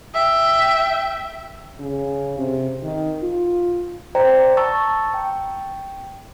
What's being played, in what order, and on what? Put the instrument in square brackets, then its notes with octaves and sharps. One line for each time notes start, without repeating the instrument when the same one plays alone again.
[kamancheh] E5 G5
[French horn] C#3
C3
D#3
F4
[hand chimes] C5 D5 G5 A#5
A5 A#5 C#6 E6 A6
G5